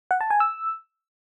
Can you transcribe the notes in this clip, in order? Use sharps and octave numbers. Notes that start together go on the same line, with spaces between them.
F#5
A5
G#5
E6